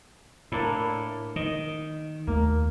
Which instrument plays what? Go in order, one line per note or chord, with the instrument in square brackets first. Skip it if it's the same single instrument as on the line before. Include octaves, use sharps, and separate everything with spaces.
[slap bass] A2 [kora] A#3 D4 E4
[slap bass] D#3 [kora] D#5
[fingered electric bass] D#2 A3 [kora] A#3